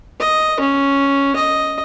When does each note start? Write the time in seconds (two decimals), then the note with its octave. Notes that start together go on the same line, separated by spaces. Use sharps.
0.20 D#5
0.60 C#4
1.36 D#5